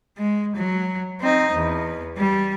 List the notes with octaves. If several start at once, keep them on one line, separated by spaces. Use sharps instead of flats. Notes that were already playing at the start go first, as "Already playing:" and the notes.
G#3
F#3
C4 D#4
E2
G3